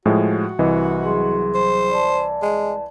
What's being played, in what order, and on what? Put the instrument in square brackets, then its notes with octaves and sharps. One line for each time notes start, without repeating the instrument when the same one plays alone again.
[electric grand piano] A2 F3 G#3 [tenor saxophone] F#4
[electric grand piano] C2 E3 D#5
[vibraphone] F#3 G#4 C6
[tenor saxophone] C5
[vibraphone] D5 A5
[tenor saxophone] G#3